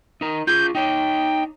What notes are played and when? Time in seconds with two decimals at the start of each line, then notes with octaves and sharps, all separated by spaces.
0.21 D#4 A#4
0.47 F4 G#4 G6
0.75 D#4 C#5 G5